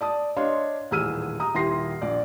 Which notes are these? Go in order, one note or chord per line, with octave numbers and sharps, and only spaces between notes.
D5 A5 D#6
D4 C#5 D#5 F5 C6
D#1 A1 G#4 E6 F6 D#7
A#5 D#6
D#1 E4 G4 C6 A#6 C7
A#1 D5